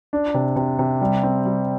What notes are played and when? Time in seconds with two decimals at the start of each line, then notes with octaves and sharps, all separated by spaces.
0.13 D4
0.34 C3
0.56 C3
0.79 C3
1.01 G3
1.23 C4
1.46 G3